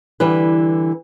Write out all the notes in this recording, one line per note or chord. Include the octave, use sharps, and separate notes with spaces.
D3 E3 G3 B4